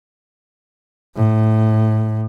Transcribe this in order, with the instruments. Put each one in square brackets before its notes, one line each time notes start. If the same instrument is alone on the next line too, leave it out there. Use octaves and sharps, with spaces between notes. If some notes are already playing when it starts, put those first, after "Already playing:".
[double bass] A2